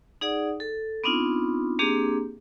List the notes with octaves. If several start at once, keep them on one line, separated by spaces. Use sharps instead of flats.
D#4 G#4 D5 F#5 D#6
A4
B3 C4 D4 D#4 F4
A#3 C4 D4 G4 G#4